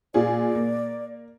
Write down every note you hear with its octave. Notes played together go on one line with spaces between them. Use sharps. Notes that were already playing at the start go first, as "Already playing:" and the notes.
A#2 F4 G#4 D5
A#3